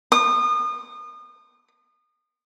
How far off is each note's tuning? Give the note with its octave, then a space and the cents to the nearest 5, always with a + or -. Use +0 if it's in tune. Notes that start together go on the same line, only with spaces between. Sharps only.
D#6 -30